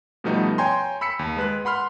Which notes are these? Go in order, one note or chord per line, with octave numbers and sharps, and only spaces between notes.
B2 F3 G3 A3 B3 D#4
C#5 G5 G#5 A#5 C6
B5 E6 B6 C#7
D#2
G#3 B4 F#6
F#5 B5 C6 F6